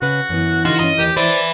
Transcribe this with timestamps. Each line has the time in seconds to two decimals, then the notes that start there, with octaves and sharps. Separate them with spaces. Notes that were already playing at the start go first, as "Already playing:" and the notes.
0.02 C#3 F#4 B4
0.29 F#2 E3 B3
0.65 D3 F#3 D#4 F4 F#4
0.79 G2 C#4 D#5
0.98 D#2 A#2 G4 A#4
1.17 B4 C5 D5 E5